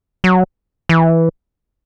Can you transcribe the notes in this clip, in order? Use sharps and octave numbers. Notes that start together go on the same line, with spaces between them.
F#3
E3